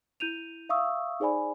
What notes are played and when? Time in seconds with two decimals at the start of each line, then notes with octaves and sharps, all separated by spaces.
0.20 E4 G6 D#7 F7
0.69 E5 F5 C#6 D#6 E6
1.20 D#4 G#4 C5 D5 G#5 B5